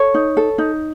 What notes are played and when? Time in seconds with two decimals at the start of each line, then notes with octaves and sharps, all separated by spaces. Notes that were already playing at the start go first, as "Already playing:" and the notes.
Already playing: A4 C#5
0.14 D#4
0.37 A4
0.58 D#4